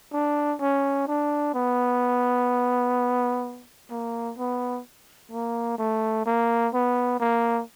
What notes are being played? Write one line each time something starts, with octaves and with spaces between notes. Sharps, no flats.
D4
C#4
D4
B3
A#3
B3
A#3
A3
A#3
B3
A#3